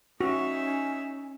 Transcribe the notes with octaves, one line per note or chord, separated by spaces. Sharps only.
C#4 D#4 F#4 E5